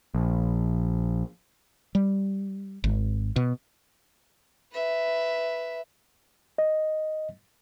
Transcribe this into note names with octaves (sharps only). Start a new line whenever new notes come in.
A#1
G3
G#1
B2
B4 E5
D#5